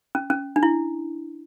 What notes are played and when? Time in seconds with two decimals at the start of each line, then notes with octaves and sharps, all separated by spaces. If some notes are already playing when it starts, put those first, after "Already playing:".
0.15 C#4
0.30 C#4
0.56 D4
0.63 E4